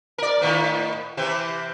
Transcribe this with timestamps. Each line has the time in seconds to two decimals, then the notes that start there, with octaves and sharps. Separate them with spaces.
0.18 A#4 D5
0.41 A2 D#3 B3
1.17 C3 E3 C4